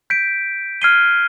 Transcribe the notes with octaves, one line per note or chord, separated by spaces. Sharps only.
G6 B6 D7
F6 G#6 C7 D#7 G7